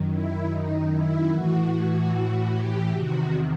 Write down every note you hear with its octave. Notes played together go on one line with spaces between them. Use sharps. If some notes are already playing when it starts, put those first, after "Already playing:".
Already playing: F#2 D#3
E4
D#4
E4
A2 E3 F#4
G4
E2 C3 D#3 F#4